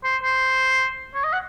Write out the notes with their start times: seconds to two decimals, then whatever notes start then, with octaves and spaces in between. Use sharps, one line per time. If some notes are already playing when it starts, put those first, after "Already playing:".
0.04 C5
0.23 C5
1.15 C#5
1.24 D#5
1.33 F#5